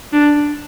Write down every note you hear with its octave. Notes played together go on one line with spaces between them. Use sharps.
D4